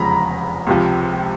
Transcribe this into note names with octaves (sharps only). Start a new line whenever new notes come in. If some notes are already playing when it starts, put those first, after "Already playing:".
Already playing: F1 E2 C#3 F3 G#3 A#5 B5
C#2 C3 F3